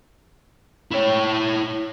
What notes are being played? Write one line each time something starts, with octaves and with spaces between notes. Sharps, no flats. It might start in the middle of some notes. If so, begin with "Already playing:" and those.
E4 C#5